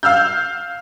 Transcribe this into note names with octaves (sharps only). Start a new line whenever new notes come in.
F5 E6 F6 G6